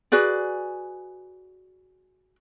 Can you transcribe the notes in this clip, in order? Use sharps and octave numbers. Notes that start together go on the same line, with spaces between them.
F#4 G#4 B4 D5